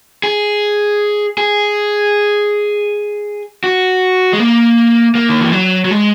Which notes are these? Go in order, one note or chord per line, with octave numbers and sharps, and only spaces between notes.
G#4
G#4
F#4
G#3
A#3
A#3
D#3
E3
F#3
F#3
G#3